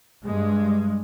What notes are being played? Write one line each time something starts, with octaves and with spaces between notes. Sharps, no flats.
G2 G#3